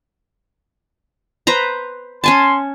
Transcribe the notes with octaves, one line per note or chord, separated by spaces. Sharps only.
B4 C5 A#5
C#4 G#5 A5 C6